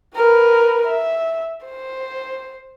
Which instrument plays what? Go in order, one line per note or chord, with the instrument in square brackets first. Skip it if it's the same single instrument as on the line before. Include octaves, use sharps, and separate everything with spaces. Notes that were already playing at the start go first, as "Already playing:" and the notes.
[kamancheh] A#4 B4
E5
C5